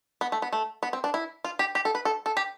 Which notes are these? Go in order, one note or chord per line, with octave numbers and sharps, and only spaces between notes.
B3
A3
B3
A3
B3
C4
D4
E4
F4
G4
G4
A4
B4
A4
A4
G4